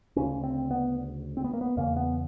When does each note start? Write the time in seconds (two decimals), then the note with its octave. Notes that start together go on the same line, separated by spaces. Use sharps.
0.16 D2 C#3 C#4
0.44 C4
0.71 B3
1.37 C4
1.44 B3
1.53 A#3
1.61 B3
1.77 E2 C#3 A#3
1.96 B3